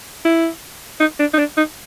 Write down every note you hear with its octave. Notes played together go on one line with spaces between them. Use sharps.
E4
D#4
D4
D#4
D4
D#4